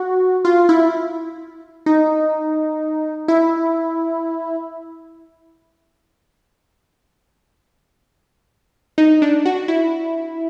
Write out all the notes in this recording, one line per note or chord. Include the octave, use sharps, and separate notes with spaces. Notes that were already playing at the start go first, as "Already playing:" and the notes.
Already playing: F#4
F4
E4
D#4
E4
D#4
D4
F#4
E4